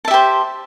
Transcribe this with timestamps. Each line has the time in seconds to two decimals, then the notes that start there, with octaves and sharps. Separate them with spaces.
0.05 A5
0.08 E5
0.11 G4
0.14 C5